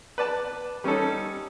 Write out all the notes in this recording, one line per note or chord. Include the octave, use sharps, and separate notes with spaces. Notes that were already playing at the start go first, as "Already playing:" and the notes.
B4 D5 A5
G3 C#4 D#4 A4